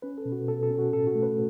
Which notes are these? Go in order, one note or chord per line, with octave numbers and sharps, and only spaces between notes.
C#4 B4
A4
B2
F#4
B2 A4
A4
C#4
F#4
A2 A4
F#4
A3
B4